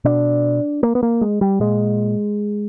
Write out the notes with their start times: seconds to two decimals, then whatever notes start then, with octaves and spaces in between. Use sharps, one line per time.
0.04 B2 D4
0.83 A#3
0.95 B3
1.03 A#3
1.21 G#3
1.41 G3
1.60 A#2 G#3